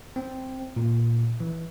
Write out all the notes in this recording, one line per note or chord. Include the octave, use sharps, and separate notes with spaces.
C4
A#2
E3